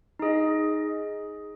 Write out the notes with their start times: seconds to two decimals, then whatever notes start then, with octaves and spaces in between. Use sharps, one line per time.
0.19 D#4 G#4 D#5